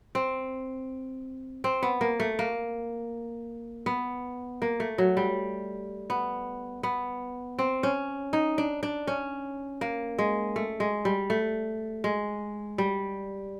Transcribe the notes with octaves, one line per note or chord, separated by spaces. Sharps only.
C4
C4
B3
A#3
A3
A#3
B3
A#3
A3
F#3
G3
B3
B3
C4
C#4
D#4
D4
D4
C#4
A#3
G#3
A3
G#3
G3
A3
G#3
G3